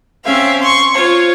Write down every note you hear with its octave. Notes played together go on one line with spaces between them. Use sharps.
C4 C#4 E5 F5
C6 C#6
F4 C5 C#5